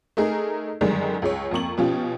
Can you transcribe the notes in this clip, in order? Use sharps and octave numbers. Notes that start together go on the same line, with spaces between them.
A3 D#4 G#4 A#4
F#2 D3 D#3 G3 G#3
C#2 G#3 C#5
F2 A#3 C#6 F#7
B2 F3 C#4 F4 G4